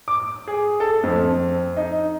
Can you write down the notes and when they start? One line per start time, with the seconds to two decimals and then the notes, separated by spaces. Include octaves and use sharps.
0.08 D6
0.48 G#4
0.80 A4
1.04 F2
1.77 D#4